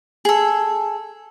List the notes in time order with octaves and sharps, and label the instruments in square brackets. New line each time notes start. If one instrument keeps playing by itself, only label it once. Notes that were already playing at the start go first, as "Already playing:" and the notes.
[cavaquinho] G#4 A4